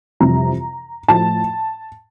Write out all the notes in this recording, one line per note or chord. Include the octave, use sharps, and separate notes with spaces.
F2 C3 E3 G3 A#5
A2 F3 A3 A5